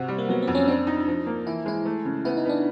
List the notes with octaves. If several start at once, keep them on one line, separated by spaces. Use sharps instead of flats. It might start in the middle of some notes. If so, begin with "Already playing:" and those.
Already playing: C3 F#4
G3
A#3
F#3 B3
C4
F2
C#4
C4 D4
D#4
F3
A#3
E3 E4
G#3 E4
A3
C#3
B3 E4
D#4
B3 D4